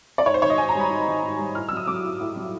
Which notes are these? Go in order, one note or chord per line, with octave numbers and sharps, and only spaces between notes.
D5
G#2 C#5
C5
D#3 C#5
D#5
G#2 G#5
A#5
G3 B5
G#2
D#3
G#2
G3
A2 F6
F#3 E6
D#6
F#3 D6
A2
A2
F#3